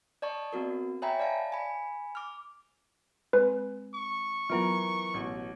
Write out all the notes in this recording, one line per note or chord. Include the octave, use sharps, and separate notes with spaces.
D5 D#5 A5 C#6
B3 C4 F#4 A#4
C#5 E5 G5 G#5 A#5 B5
D5 F5 A5
G#5 B5
D6 F6
G#3 C4 B4
C#6
E3 F#3 B3 F4 A#4
A1 B2